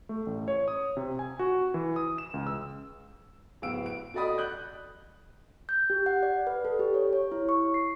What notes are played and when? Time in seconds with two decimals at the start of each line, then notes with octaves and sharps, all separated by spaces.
0.09 A3
0.26 A1
0.48 C#5
0.68 D#6
0.97 C3
1.19 G#5
1.39 F#4
1.74 E3
1.96 D#6
2.18 E7
2.34 C#2
2.47 E6
3.62 D1 B3 F5 E6 D7
3.86 D7
4.14 F#4 A4 D5 D#5 B5 D#6
4.38 F#6 G6
5.69 G6
5.90 G4
6.06 F#5
6.23 D5
6.47 B4
6.65 A4
6.79 G4
6.94 C#5
7.13 C#5
7.32 E4
7.49 C#6
7.74 C7